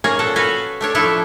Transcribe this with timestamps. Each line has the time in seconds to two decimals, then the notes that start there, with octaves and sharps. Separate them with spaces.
0.04 A#3 C#4 G#4 C#5
0.19 A#2 A4 F#5 A5
0.36 F#4 A4 B4 F5 G#5
0.81 A3 D4 C#5
0.95 F3 A3 D4 E4 A4 C#5